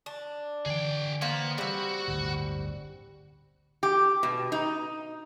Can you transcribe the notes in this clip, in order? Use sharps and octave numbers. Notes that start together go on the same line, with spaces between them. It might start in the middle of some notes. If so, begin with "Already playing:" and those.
D4
D3 E3 G#4 G5
A#3 B3 C5
G3 C4 F#4
G1 D2 A2
G4
B2
D#4